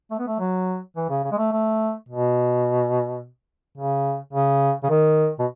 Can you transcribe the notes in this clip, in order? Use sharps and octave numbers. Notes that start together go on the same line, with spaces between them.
A3
B3
A3
F#3
E3
C#3
C#3
G#3
A3
A3
B2
C#3
C#3
C#3
D#3
B2